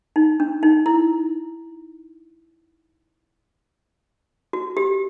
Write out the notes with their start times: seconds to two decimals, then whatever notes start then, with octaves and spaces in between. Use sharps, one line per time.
0.16 D#4
0.40 D4
0.63 D#4
0.86 E4
4.53 F#4
4.77 G4